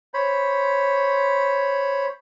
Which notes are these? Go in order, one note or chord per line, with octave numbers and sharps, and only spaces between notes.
C5 C#5 B5